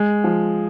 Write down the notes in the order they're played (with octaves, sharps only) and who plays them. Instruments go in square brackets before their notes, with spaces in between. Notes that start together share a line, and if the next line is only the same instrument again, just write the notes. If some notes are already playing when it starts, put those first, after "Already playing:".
Already playing: [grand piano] G#3
F3